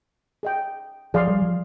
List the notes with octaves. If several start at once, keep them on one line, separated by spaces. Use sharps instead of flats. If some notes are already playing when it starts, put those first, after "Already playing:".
G#4 D#5 G5
F3 G#4 D5 F5 C6
G3
F3